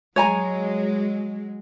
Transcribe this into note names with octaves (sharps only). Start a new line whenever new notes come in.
F#3 G#3 C#5 G#5 A#5